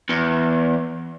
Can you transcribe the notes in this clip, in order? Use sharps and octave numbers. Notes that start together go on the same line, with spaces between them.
E2